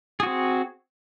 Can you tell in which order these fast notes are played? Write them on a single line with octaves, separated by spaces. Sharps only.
G#4 F#4 C4